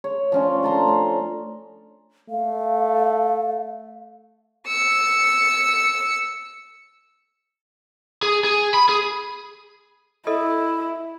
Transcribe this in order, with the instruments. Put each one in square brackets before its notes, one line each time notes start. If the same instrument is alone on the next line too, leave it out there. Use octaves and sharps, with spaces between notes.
[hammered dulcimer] C#5
F3 C#4 D4
A3 A5 A#5 C6
C#4
[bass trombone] A3 [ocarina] F5
[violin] E6 C#7
[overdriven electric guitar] G#4
G#4
B5
G#4
[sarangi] E4 [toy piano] A4 D#5